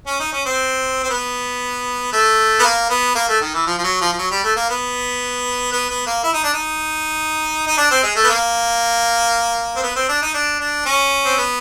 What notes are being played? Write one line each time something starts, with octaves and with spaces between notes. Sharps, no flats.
C#4
D#4
C#4
C4
C4
B3
A3
B3
A#3
B3
A#3
A3
D#3
E3
F3
F3
F#3
F3
F3
F#3
G3
A3
A#3
B3
B3
B3
A#3
E4
D#4
D4
D#4
D#4
D4
C4
G#3
A3
B3
A#3
C4
B3
C4
D4
D#4
D4
D4
C#4
C4
B3